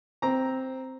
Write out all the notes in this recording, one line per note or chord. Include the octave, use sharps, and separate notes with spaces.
C4 A#5